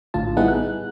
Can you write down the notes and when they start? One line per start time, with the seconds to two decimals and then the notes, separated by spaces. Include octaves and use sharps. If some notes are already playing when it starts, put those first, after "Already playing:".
0.14 A#1 A2 D3 F4 A5
0.37 G3 B3 D#4 E4 G#4 F#5
0.48 F#6